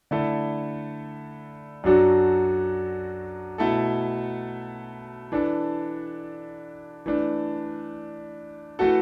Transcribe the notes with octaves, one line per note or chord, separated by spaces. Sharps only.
D3 A3 E4 A4
F#2 F#3 D4 F#4 A4
B2 A3 E4 A4
E3 D4 A4
E3 A3 D4
E3 A3 F#4 A4